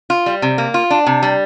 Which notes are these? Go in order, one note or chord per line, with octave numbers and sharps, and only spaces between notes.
F4
G3
C3
A#3
F4
D4
C3
G3